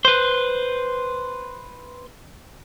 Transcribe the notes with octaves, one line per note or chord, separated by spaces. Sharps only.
B4 C5